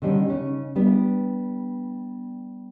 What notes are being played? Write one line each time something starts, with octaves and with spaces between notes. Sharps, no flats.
D3 D#3 G3 C#4
C#3 C#4 D#4
G3 B3 D4